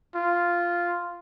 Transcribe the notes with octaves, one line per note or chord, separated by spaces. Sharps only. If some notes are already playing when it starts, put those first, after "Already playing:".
F4